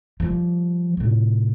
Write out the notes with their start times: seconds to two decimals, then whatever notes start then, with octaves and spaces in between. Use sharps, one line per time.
0.20 F3 G3
0.97 A2 C3